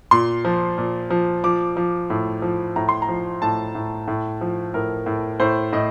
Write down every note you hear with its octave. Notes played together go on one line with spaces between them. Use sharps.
A#2 C6
F3
A#2
F3
F3 D6
F3
A2
F3
A2 A#5
C6
A#5
F3
A2 A5
A2
A2
F3
A2 A#4
A2
A2 C5
A2 D#5